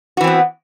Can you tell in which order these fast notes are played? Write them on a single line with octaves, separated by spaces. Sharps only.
F#4 E3 C4 B3